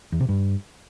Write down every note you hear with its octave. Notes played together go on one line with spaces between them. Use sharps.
E2
C3
G2